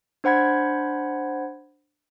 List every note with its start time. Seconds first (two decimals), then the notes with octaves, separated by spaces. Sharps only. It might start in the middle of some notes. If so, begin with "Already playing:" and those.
0.24 D4 C5 F#5 B5 G#6